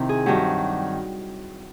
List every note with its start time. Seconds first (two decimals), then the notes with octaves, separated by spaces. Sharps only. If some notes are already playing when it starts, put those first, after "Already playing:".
Already playing: C3 D#3 C4 E4
0.09 G#4
0.26 G2 D#3 F#3 G4